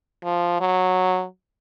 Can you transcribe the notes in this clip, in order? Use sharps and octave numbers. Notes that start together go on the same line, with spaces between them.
F3
F#3